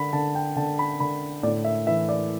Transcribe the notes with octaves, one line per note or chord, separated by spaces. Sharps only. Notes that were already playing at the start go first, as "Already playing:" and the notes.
Already playing: D3 B5
D3 A5
G5
D3 A5
B5
D3 B5
A2 D5
E5
E3 E5
D5